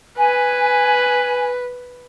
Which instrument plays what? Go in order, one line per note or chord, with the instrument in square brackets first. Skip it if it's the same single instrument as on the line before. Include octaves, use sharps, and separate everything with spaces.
[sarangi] B4 [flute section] G#5